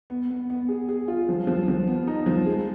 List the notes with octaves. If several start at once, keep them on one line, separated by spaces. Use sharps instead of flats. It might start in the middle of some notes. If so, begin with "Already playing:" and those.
B3
B3
B3
G#4
G#4
F4
F3
F3
F3
B3
D#4
F3
G#3